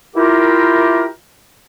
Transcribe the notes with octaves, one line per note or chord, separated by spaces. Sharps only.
E4 F4 G4 A#4